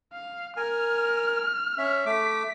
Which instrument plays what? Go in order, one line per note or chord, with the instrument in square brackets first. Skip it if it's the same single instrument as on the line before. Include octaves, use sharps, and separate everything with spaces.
[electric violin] F5
[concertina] A#4 G#5 [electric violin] F6
[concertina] C#4 E5
[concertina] A3 D6 [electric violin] B6